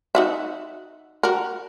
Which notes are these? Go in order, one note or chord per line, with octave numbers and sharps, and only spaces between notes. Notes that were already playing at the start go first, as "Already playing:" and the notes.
D#4 F#4 E5
F#4 A#4